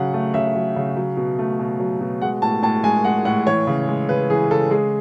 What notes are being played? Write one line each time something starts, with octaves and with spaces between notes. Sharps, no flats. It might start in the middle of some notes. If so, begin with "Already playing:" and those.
Already playing: C#3 F#3 F#5
A3
C#3 E5
F#3
C#3
F#3
B2
A3
B2
F#3
B2
G#3 F#5
A2 A5
A2 A5
G#3 G#5
G#3 F#5
A2 F#5
E3 C#5
C#3
G#3
C#3 B4
E3 G#4
C#3 A4
G#3 G#4